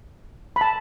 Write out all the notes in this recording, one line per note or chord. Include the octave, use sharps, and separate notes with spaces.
B5
A5